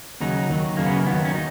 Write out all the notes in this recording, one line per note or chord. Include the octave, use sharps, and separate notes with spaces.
D#2 C#3 F#3 D#4
D#2 D#3 F#3
F#2 C#3 F#3 A#3
B3
A#3
D#2 D#3 F#3 B3
C#4
D#4